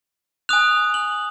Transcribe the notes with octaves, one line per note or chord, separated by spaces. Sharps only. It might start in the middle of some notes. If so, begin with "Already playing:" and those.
G#5 D#6 F#6 F7
F#7